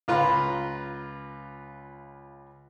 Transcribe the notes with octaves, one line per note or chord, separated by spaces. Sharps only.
C#2 F4 B4 F5 A#5 C6